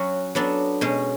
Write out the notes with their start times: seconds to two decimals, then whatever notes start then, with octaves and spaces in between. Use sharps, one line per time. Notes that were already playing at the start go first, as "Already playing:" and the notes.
Already playing: F#3 C#4 F#4
0.35 F#3 B3 D4 A4
0.81 B2 G#3 C#4